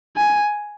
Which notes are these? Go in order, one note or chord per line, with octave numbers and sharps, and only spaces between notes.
G#5